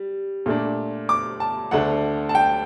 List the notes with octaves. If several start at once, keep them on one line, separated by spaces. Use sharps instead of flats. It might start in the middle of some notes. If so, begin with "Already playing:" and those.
Already playing: G3
A#2 A3 D4
D6
A5
D2 D3 A3 D4 F#5
A5
G5